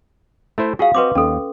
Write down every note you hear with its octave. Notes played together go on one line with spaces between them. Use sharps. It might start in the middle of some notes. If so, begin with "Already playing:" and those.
A3 E4 C5
F4 F#4 G#4 F5
C4 F#4 B4 D#5 C6 D6
D#2 C#4 A4